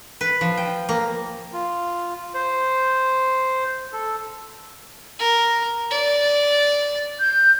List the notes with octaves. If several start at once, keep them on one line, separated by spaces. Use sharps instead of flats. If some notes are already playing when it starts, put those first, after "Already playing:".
B4
F3
G5
A#3
F4
C5
A4
A#4
D5
G6